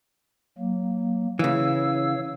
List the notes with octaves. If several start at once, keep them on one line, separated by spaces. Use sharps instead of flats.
F#3 A#3
C#3 E3 C#5 F5 E6